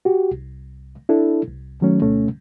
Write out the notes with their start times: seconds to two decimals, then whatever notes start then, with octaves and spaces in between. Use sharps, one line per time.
0.05 F#4 G4
0.31 C2
1.09 D4 E4 A4
1.48 C2
1.81 D#3 F#3 A3 C#4
2.02 D2 B2 A3 C#4